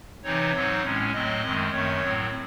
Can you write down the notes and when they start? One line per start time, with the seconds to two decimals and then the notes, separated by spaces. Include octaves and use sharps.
0.23 C3 E3 C4 D#4 C#5
0.53 G#2 F#3 C4 D#4
0.83 A2 G#3 C#4
1.12 A2 F#3 A3 C4 D#5
1.43 F#2 D#3 G#3 C4
1.71 F#2 D#3 A3 C#5
2.01 A2 F#3 C4